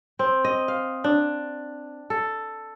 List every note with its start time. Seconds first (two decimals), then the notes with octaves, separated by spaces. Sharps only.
0.19 C4
0.45 D#5
0.68 F5
1.04 D4
2.10 A4